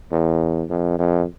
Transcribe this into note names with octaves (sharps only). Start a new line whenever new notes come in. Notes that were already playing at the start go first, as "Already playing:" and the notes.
E2
F2
F2